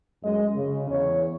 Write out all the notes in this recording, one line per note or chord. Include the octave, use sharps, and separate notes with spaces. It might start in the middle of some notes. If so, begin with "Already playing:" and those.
F#2 G#3 D#5
C#3
E2 C#5